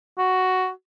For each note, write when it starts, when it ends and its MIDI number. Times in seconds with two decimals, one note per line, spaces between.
0.18 0.69 66